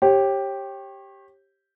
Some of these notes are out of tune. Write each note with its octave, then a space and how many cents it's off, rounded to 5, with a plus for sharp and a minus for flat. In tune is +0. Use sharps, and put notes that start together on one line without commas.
G4 +0 C#5 -35